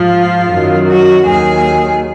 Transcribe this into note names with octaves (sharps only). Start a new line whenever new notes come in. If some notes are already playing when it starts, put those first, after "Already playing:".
Already playing: G#2 F3 F4
F#2 D#3 F#3
F#4
D#2 D#3 F#3 G#4